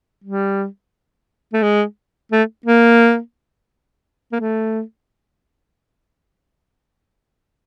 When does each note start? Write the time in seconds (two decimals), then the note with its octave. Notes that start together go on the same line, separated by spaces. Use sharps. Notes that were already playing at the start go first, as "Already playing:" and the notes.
0.24 G3
1.53 A3
1.63 G#3
2.32 A3
2.66 A#3
4.32 A#3
4.40 A3